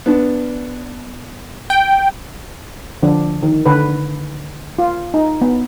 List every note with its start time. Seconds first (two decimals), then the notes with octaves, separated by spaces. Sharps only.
0.06 B3 D4
1.70 G5
3.03 D3 F3 D4
3.43 D#3
3.66 D3 B4
4.78 F4
5.14 D#4
5.41 B3